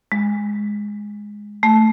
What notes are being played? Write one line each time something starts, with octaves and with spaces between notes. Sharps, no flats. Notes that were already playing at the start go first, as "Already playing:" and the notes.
G#3
A3